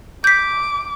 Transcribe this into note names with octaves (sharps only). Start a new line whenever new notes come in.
D6 G6 B6